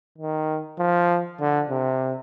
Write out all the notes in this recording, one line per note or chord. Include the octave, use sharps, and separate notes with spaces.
D#3
F3
D3
C3